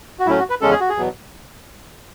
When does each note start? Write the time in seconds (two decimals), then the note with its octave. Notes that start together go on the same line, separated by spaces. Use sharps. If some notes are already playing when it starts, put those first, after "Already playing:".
0.19 F#4
0.26 A2 F#3 A3 C#4 E4
0.39 F#4
0.50 B4
0.61 E2 C#3 G#3 C#4 A4
0.71 G#4
0.80 F#4
0.89 G#4
0.96 E2 B2 F#3 B3